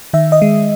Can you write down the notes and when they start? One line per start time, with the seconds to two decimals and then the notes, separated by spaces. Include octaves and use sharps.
0.13 D#3 E5
0.32 D#5
0.42 G#3